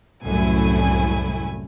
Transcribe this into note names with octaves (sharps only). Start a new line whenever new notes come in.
C2 F#2 A2 A3 E4 G#5